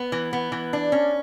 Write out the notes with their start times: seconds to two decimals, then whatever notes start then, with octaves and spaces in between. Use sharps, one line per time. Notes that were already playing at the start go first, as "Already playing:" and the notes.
Already playing: B3
0.12 E3
0.33 B3
0.52 E3
0.73 D4
0.92 C#4